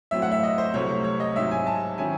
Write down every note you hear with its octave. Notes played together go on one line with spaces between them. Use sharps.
A2 F#3 C4 E5
F#5
E5
D#5
C5
C2 C3 F#3 A3 C#5
C#5
C#5
D#5
G#2 F#3 C4 D#4 E5
G#5
A5
D#3 F#3 C#4 E4 G#5